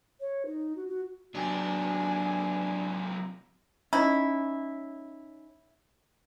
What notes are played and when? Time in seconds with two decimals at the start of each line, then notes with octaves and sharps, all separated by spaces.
0.20 C#5
0.46 D#4
0.76 F#4
0.88 F#4
1.35 C3 F#3 D4 G#5
3.93 C#4 D#4 E4